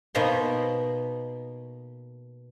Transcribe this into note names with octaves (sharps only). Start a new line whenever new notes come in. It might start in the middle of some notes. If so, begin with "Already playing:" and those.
B2 A#3 D#4 B5 C6